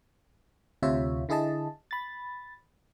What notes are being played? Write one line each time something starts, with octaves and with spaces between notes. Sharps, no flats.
D2 C3 F4 C#5 E5
D3 E4 G#4 D#5 A5
B5 A6